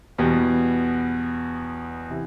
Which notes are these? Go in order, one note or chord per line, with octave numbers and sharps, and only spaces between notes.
E2 B2 G3 B3
C3 E3